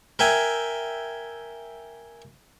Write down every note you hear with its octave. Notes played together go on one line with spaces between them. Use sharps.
A#4 E5 G5 G#5